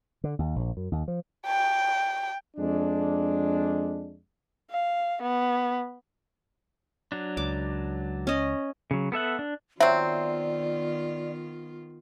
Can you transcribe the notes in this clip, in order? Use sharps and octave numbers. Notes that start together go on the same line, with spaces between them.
D3
D#2
A#1
F#2
D#2
F3
G5
F2 G#3 D4
F5
B3
F#3 D4
C#2 D6
C#4 D#5
C#3 F#3
B3 A4 E5 F#5
D4
D#3 F#3 B3 C4 F4 D5 E5